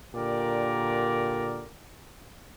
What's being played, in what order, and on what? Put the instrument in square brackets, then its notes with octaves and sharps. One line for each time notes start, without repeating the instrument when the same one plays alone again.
[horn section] A#2 D3 G4 A#4 D5